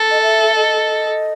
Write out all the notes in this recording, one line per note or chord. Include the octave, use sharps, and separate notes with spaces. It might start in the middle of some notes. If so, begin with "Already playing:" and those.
Already playing: A4
D#5
E5
D#5